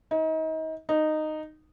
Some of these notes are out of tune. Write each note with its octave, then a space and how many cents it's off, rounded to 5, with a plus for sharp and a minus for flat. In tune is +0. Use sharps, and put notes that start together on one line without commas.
D#4 +35
D#4 -10